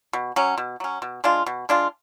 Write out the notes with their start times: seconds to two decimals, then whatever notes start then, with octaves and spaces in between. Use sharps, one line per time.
0.13 B2
0.36 F#3 C#4
0.58 B2
0.80 F#3 C#4
1.02 B2
1.24 G#3 D4 F4
1.47 B2
1.69 G#3 D4 F4